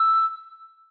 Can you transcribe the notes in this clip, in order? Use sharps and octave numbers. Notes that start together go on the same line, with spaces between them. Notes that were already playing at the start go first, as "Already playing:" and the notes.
Already playing: E6